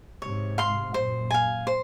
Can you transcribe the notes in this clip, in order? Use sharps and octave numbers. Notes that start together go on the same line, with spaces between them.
G#2 C3 C#5
F5 C6
F#2 A#2 C5
F5 G#5
C5